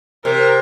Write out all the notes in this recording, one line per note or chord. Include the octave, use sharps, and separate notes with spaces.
C3 A#4